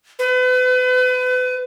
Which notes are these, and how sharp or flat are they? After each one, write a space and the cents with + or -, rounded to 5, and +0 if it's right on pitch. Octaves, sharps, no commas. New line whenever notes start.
B4 +35